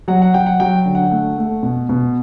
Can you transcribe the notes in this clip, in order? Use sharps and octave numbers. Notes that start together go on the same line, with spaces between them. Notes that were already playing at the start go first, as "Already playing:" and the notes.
F#3 F#5
F#5
F#3 G5
F#5
F#3 G5
D3
F#5
A3
A3
B2
B2